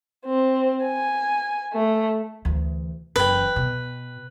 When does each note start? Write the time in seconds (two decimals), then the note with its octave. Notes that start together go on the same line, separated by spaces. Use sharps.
0.26 C4
0.85 G#5
1.73 A3
2.45 D2 E3
3.16 F#1 E3 B4 G5
3.56 B2